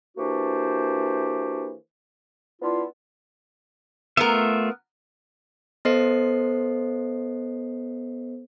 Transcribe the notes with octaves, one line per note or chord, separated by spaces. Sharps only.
E3 A#3 D4 F#4 G4 C5
B3 D4 E4 F4
A3 B3 F4 A#4 E5
B3 A4 C5 D#5 C7